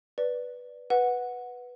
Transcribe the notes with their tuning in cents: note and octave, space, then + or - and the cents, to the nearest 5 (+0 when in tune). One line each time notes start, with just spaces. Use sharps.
B4 +0 D5 +0
B4 +0 F#5 -10